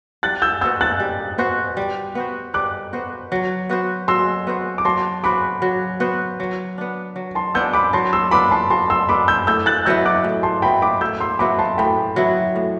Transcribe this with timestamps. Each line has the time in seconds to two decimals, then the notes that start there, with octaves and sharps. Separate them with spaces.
0.23 G3 F#6 A6
0.42 E6 G6
0.61 B3 F#4 C5 E6 G6
0.81 F#6 A6
1.00 G3
1.38 B3 F#4 C5
1.77 G3
2.15 B3 F#4 C5
2.54 G3 D6 F#6
2.93 B3 F#4 C5
3.32 F#3
3.69 B3 F#4 C5
4.08 F#3 C6 E6
4.47 B3 F#4 C5
4.78 D6
4.85 F#3 A5 C6
5.23 B3 F#4 C5 B5 D6
5.62 F#3
6.00 B3 F#4 C5
6.40 F#3
6.78 B3 D4
7.16 F#3
7.35 A5 C6
7.54 B3 D4 E6 G6
7.73 B5 D6
7.93 F#3 A5 C6
8.13 C6 E6
8.31 B3 D4 B5 D6
8.51 A5 C6
8.70 F#3 A5 C6
8.90 C6 E6
9.09 B3 D4 B5 D6
9.28 E6 G6
9.47 A2 E6 G6
9.66 F#6 A6
9.85 F#3 B3 E4 E6 G6
10.05 D6 F#6
10.24 A2
10.43 A5 C6
10.62 F#3 B3 E4 G5 B5
10.82 B5 D6
11.01 A2 E6 G6
11.20 C6 E6
11.39 F#3 B3 E4 B5 D6
11.59 A5 C6
11.78 A2 G5 B5
12.16 F#3 B3 E4
12.56 A2